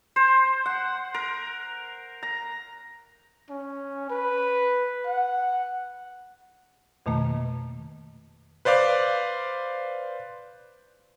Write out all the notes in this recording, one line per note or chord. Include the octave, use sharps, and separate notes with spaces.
C5
F#5
A#4
A#5
C#4
B4
F#5
F2 B2 D#3 A3 A#3
B4 C5 D5 F5 D6